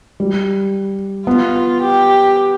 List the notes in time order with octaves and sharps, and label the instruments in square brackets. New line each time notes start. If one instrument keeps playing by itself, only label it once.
[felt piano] G3
[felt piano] B3 [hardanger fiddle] F4
[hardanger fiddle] G4